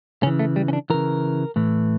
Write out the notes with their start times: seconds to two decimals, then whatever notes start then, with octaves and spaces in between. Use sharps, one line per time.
0.23 C#3 E3 C#4
0.39 A3
0.56 G3
0.68 C#4
0.73 D4
0.90 C#3 E3 A#4
1.56 A2 E3